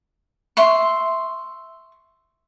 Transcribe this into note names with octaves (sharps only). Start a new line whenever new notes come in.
E5 C6 C#6